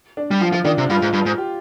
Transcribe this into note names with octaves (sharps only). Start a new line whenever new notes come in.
D4
G3
F3 F4
F3 F4
D#3 D4
C3
G2 F4
G#2
G2
G#2
G4